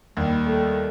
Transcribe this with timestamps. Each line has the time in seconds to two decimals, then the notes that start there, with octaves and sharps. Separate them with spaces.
0.17 D#2 G3
0.46 A3